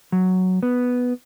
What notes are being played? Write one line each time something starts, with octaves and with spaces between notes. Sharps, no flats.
F#3
B3